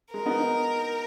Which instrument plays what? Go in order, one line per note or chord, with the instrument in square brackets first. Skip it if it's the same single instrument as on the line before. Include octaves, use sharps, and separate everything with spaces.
[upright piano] G#3 [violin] A#4
[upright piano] B3 D#4
B3 D#4